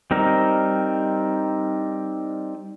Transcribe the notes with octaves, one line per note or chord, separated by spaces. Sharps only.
G3 C4 D#4 A#4